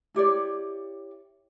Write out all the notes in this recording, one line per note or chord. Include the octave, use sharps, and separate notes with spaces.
E4 G4 C#5 D5